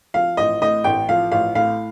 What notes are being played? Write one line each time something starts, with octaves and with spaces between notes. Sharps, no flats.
F3 F5
A1 D#5
A2 D#5
A1 G5
F3 F5
A1 F5
A2 F5